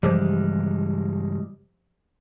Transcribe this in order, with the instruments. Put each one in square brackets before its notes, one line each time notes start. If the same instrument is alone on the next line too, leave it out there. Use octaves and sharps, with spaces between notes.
[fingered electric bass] G2 C#3 E3 [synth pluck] F3 G4 C5 [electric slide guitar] G3 G#3